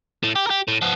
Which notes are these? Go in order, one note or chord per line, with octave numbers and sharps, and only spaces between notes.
A2
G4
G4 A#4
A2
F3 B3